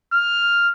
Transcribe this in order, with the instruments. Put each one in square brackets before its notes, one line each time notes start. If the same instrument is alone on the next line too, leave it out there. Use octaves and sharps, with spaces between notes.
[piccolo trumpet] F6